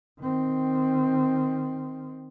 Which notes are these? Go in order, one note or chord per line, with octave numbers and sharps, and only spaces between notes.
D#3 C4